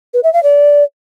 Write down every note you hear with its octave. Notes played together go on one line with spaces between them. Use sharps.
B4
E5
F5
D5